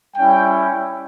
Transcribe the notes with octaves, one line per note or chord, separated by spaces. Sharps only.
G3 C#4 E4 G5